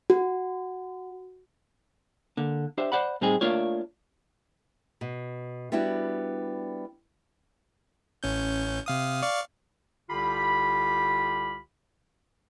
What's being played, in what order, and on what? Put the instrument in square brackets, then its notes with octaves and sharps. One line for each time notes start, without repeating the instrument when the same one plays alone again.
[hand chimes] F#4
[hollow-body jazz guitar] D3 A#3
D4 G4 C5 E5
C5 D5 F#5 B5
A2 G3 C4 D#4 G#4
A3 A#3 D4 F4 C#5
[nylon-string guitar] B2
G3 B3 D4 E4 F#4
[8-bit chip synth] A1 C#4 G6
C3 F5 D#6
D5 F5 C#6
[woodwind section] C2 D3 F4 G4 B5